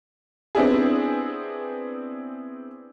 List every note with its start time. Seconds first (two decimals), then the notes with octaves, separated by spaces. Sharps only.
0.55 B3 C4 D4 E4 G#4